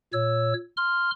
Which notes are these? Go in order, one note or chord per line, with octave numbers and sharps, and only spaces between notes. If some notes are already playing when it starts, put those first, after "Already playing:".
A#2 C#5 E6
C6 F6